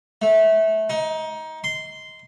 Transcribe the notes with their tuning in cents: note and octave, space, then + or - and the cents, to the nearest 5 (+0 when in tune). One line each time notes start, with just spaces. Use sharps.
A3 -20
D#4 +20
C6 -10